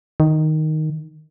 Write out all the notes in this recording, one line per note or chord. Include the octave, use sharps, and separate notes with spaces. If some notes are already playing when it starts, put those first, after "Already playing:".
D#3